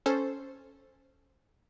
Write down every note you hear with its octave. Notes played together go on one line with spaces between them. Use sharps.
C#4 A4 C5